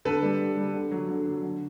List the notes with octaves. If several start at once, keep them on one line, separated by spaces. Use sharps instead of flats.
D3 A4 B4
G3
D3
G3
D3
F#3
D3
F#3
D3